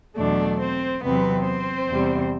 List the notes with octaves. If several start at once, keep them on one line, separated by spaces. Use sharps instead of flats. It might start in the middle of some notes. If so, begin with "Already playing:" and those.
E2 B2 F#3 A3 D4 D5
C4 C5
E2 C3 F#3 B3 C4 B4
C4 C5
E2 C3 G3